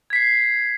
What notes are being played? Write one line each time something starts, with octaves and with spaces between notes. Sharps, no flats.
G#6 B6 C7